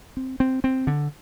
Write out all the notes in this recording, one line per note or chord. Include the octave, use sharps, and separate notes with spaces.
C4
C4
C4
D3